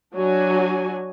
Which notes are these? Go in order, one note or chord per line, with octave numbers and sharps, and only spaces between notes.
F#3 D4 F#4 G#5